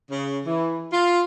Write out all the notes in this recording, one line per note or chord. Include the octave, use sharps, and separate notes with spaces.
C#3
E3
F4